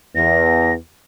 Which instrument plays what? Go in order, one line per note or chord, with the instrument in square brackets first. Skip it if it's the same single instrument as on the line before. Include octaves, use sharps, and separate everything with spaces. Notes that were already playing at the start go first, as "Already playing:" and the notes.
[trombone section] E2 [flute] A#6